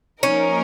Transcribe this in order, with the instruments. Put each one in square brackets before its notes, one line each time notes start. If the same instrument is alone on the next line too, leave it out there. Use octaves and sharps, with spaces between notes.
[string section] F3 A#3 D#4 A#4 [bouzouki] C#4